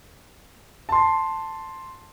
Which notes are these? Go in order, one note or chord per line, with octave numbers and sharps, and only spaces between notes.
A5 C6